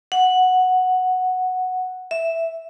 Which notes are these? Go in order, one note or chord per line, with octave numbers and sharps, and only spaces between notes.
F#5
E5